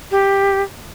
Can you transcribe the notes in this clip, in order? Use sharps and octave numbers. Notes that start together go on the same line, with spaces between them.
G4